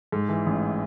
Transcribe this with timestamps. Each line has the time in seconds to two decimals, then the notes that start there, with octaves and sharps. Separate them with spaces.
0.12 G#2
0.29 E3
0.46 A1